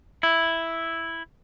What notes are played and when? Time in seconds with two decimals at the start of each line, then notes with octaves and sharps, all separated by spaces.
0.23 E4